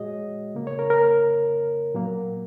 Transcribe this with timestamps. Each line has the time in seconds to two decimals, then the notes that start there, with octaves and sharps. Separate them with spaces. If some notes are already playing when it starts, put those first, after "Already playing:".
Already playing: A#2 G#3 F#4 G#4 C#5 D#5
0.55 C#3 A#3
0.67 C#5
0.79 A#4
0.90 A#4
1.94 A#2 F#3 A#3